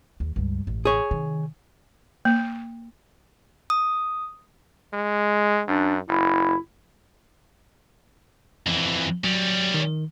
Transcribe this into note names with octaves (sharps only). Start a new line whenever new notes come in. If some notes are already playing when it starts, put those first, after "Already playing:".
D#2
C#2 G2
A1
G#4 C#5
C3 D#3
A#3
D#6
G#3
F#2 D4
F#1 E4
F2 E3
F#3 G3 C#4
D#3